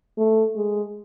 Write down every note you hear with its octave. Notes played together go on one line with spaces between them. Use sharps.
A3
G#3